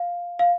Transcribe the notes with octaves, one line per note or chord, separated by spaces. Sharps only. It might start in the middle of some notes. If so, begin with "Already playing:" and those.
Already playing: F5
F5